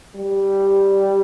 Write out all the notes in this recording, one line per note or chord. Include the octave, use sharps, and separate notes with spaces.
G3